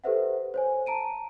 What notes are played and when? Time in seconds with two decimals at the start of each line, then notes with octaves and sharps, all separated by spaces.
0.04 G4 A4 B4 C5 E5 F#5
0.54 C5 C#5 G#5
0.86 A5 A#5 D7 D#7